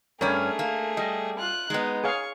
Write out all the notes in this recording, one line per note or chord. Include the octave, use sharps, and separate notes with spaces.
G2 A3 C#4 G#4 A#4 C#5 D5
A#3
G3 D#5
F4 F#6
G#3 B3 D#4
G#4 C#5 F5 C#6